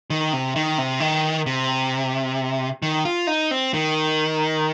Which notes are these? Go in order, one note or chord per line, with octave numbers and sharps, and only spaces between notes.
D#3
C3
D#3
C3
D#3
C3
D#3
F4
D#4
C4
D#3